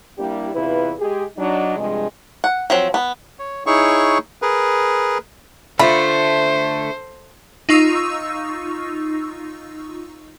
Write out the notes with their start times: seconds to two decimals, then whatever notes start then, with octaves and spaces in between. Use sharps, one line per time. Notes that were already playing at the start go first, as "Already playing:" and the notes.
0.18 G3 A#3 D4 E4 G4
0.55 E2 C3 E4 F4 B4
0.99 G#3 G4 G#4
1.37 F#3 D4 D#4
1.77 G2 C3 F3 G#3
2.44 F#5
2.70 F3 F#3 C4
2.94 B3
3.39 C#5
3.66 D#4 E4 G#4 C#5 C#6
4.42 G#4 A#4 B4
5.79 D3 A3 F4 C5 B5
7.69 D#4 F4 C#6 E6